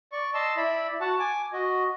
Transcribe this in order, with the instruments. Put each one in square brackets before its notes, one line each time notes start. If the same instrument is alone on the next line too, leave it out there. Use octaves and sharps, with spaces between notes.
[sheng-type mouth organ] D5 C#6
D#5 A5 C6 E6
E4 D5 E5 B5
F#4 F#5 A5
G#5 D6
F#4 D#5